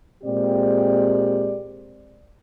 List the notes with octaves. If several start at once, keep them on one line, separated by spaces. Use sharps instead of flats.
A#2 G#3 C4 G4 D5